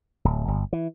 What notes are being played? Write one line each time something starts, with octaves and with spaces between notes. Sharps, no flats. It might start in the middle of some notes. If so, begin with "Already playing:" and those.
D1
G1
E3